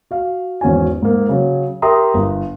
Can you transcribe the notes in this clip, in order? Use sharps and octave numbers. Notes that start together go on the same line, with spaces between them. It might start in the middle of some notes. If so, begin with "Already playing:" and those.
F#4 F5
G#1 E2 C#4 F#4 G#5
G#2 A#3
C#3 F#3
G4 A#4 E5 A#5 C6 D#6
G1